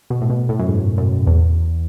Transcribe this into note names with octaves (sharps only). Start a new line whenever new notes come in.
B2
A2
B2
A2
F#2
G#2
F#2
E2